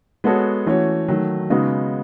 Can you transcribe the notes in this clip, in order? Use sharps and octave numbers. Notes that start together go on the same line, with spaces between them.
G#3 B3 F#4 A4 C#5
E3 A3 C#4 F#4 C#5
D#3 F#3 A3
C#3 G#3 B3 D#4 F#4